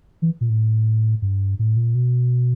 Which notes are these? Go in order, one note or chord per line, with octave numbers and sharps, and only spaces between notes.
E3
A#2
A2
G2
A2
A#2
B2